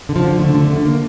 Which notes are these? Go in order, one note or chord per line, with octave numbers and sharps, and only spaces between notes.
D3
F3
D3
D3 A3
D3
D3
A#3